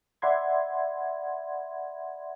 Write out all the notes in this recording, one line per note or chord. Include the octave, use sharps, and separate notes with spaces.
D5 E5 F#5 B5 C6 G#6